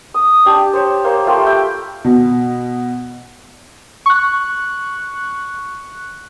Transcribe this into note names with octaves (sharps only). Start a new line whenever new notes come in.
D#6
D4 G4 A5
C5 C#5
A#3 C5
A3 F4 G4 C6
E5 G5 B5
B2
C#6 F#6